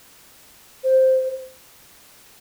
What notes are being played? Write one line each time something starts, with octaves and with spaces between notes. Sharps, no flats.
C5